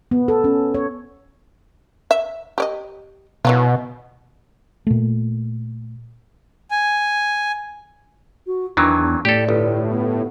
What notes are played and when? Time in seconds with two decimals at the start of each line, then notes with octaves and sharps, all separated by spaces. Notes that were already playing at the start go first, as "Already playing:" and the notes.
0.11 B3
0.28 A4
0.44 C#4
0.74 C#5
2.11 E5
2.58 G4 D5 D#5
3.45 B2 E3 F#3 F4
4.87 A#2 A3
6.71 G#5
8.47 F#4
8.77 E2 D#3 E3 F#3 D4
9.25 A2 G4 A4 D5
9.49 G1
9.90 B3